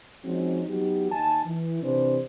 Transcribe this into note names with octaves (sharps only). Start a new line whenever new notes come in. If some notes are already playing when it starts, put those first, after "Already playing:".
F3 G#3 C4 C#4 D#4 F#4
F#3 B3 D#4 F#4 G4
D#2 D#4 G#5 A5
E3
C3 E3 D4 G4 C5